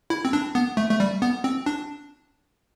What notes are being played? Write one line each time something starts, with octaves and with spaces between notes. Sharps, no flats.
E4
C4
D4
B3
A3
A3
G3
B3
C4
D4